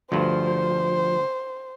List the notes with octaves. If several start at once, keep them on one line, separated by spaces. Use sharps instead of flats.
D2 G2 F3 C5